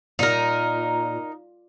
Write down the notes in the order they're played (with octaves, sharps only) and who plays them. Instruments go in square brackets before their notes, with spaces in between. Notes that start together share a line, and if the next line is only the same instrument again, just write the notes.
[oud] A#2 [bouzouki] D#4 A#4